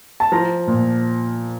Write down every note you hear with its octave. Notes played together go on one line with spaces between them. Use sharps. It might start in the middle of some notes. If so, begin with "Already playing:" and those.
A5
F3 A#5
A#2